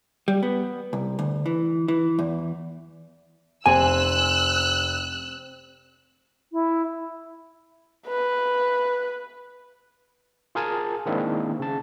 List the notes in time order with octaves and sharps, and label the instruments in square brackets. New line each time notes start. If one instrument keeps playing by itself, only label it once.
[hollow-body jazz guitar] G3
B3
C2
D2
E3
E3
E2
[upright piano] F1 [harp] C4 [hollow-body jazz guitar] G#5 [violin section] E6 F#6
[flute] E4
[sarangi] B4
[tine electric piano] F4 G#4 A#4 G#5 A5
D#3 G#3 A#3 C4 D4 E4
C#3 A5